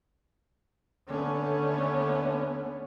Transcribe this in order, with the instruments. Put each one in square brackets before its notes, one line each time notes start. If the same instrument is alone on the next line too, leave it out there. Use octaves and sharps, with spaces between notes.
[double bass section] D#2 D3 A3 B3 C#4